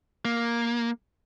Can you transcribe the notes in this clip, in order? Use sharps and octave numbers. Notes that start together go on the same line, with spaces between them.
A#3